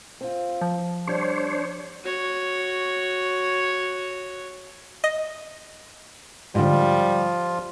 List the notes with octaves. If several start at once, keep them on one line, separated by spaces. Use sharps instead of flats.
C4 F4
F3
G3 C4 D4 C5 C#5
F#4 C#5
D#5
G#2 D3 F3 G3 F4